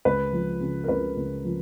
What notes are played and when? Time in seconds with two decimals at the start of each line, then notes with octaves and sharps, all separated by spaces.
0.05 C#2 B4
0.33 F3
0.61 C#3
0.84 A#4
0.88 C#2 B4
1.17 C#2
1.45 F3